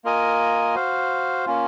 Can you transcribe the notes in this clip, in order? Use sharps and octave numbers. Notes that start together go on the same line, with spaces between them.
A#3 F4 A#4 D#5 G#5
F#4 C5 F5
A#3 C#4 F4